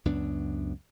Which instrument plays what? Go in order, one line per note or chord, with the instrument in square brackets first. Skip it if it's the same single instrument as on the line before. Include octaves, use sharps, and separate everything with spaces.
[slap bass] C#2 F#2 B3 D4